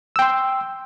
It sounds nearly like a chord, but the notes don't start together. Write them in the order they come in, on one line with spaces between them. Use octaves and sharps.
E6 G5 C6